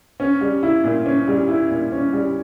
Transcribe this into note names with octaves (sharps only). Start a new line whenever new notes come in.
C#4
G3
E4
A#2
C#4
G3
E4
A#2
C#4
G3